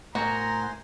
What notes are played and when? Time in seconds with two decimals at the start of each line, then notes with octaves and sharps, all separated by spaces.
0.15 A2 F#4 A#4 C5 G#5 A#5 C6